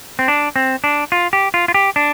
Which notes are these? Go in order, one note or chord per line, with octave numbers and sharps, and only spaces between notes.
C4
D4
C4
D4
F4
G4
F4
F4
G4
D4